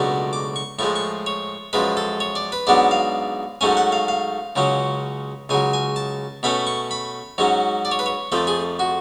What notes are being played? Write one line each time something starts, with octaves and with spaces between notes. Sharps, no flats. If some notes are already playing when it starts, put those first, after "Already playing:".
Already playing: C#2 B2 F#3 A3 D4 C#6
D6
C#6
A2 F3 G#3 C#6
C#6
C#5
F#2 F3 G#3 B4
A4
C#5
D5
B4
G#2 F#3 B3 D4 D5
F5
G#2 F#3 A3 C#4 G#5
F#5
F5
F5
C#2 C#3 F#3 C#4
C#2 C#3 F#3 G#5
G#5
A5
B2 A3 C#4 B5
C#6
B5
G#2 F#3 C#4
D5
C#5
B4
C#5
F2 F3 A3 A4
G#4
F#4